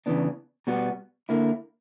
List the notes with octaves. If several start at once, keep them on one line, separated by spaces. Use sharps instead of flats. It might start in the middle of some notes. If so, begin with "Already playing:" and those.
E2 C#3 E3 B3 D4
B2 G3 B3 F#4
D3 A#3 E4